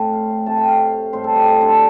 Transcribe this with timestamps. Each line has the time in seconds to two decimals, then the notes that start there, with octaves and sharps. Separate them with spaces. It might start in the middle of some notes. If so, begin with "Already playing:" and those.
Already playing: A2 A3 C4
0.13 F5
0.30 F5
0.46 C3 A3 C4 A5
0.58 G5
0.69 F5
1.13 A2 G3 C4 C5
1.24 A4
1.35 G4
1.46 G4
1.54 F4
1.61 D4
1.69 F4